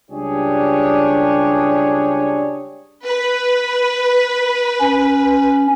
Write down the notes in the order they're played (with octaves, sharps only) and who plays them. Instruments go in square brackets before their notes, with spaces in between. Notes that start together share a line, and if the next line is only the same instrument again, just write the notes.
[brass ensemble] C#2 G3 D4 G4 G#4 C#5
[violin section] B4
[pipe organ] C#4